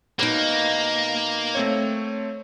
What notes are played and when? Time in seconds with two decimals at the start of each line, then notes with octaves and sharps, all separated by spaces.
0.19 B2 A#3 D#4
1.55 A3 C4 C#5